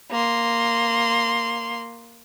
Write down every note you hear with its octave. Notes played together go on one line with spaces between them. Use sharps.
A#3 C6